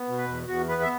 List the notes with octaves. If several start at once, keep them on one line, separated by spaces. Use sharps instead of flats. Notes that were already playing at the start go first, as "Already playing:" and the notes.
Already playing: B3
B2
B4
E2
E2 F#4
B3 B4
E5